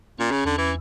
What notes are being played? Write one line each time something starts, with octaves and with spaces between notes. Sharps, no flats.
A#2 C#4
C#3
E2 D3
E3